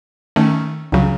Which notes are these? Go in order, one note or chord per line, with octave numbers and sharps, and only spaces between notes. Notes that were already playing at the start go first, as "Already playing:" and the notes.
D#3 A3 C#4
C#2 C#3 F#3